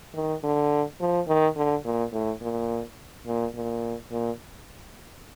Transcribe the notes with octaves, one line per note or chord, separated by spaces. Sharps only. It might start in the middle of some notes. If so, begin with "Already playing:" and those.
D#3
D3
F3
D#3
D3
A#2
A2
A#2
A#2
A#2
A#2